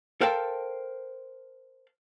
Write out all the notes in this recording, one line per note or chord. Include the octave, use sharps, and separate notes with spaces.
A4 A#4 C5 F5 G5 A5